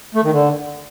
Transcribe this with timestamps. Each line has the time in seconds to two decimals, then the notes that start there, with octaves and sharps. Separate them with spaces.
0.15 A3
0.23 D#3
0.32 D3